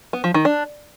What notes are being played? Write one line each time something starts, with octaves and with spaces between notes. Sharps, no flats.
B3
F3
D#3
D4